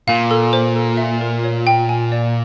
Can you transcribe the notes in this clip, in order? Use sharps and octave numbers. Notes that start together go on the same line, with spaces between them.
A#2 F5
A4
C5
A4
E5
A#4
C#5
G5
G#5
D5